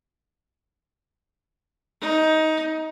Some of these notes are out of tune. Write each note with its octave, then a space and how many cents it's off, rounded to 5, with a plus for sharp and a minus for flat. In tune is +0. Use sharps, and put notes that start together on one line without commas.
D#4 +15